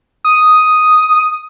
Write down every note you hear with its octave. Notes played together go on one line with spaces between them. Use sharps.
D#6